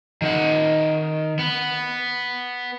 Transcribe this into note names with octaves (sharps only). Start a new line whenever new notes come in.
D#3 F#5
B3